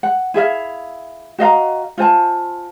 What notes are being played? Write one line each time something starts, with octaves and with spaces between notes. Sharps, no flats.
F#5
E4 G#4 E5 F5
F#4 D#5 F5 A#5
F4 C5 G#5 A5